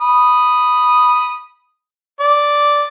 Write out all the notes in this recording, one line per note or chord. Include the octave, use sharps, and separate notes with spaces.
B5 D#6
D5